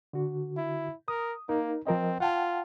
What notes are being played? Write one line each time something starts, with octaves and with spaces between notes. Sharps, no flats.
D3 F#4
E4
A#4 D#6
A#3 D#4 A#4
F3 C4 A#4 D#5
F4 F#5 G5 A5